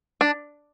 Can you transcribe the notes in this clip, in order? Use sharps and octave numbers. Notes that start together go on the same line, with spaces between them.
D4